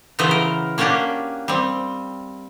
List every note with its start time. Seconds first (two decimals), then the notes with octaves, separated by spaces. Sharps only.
0.19 C#3 E3 F#3 B3 C5
0.31 A#4
0.78 A#3 C#4 D4 F#4 G4
1.48 G3 C4